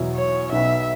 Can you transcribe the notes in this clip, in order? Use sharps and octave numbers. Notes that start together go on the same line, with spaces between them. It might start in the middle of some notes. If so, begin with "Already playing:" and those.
Already playing: E2 B2 F#3 E4
C#5
B1 B2 B3 E5